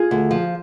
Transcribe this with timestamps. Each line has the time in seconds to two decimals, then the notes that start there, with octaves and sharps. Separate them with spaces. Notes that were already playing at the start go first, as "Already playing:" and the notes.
Already playing: F4 G#4
0.11 D2
0.31 F3